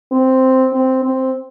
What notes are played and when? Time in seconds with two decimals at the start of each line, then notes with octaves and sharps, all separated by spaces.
0.12 C4
0.73 C4
1.03 C4